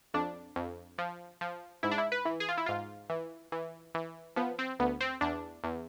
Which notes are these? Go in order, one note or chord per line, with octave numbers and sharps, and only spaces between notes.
F2 D4
F2
F3
F3
G#2 E4
D4
E4
B4
E3
G#4
F4
E4
G#2 F4
E3
E3
E3
F3 B3
C4
D2 B3
C4
E2 D4
E2